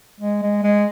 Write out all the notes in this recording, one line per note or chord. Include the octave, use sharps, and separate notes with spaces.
G#3
G#3
G#3